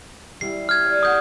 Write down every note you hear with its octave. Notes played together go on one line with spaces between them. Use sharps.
G3 E4 C7
F6 G#6
C#5 D5
F#5 D#6 G6